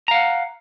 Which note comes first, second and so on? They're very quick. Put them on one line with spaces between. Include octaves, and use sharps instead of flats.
A#5 F5 F#5